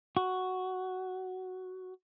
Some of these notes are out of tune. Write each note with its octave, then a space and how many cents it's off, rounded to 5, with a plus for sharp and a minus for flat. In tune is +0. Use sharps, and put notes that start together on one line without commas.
F#4 +5